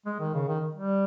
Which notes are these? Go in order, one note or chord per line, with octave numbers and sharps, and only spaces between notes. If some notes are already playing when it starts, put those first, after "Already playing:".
G#3
D#3
C#3
D#3
G3